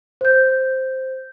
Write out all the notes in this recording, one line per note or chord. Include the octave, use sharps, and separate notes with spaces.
C5 G6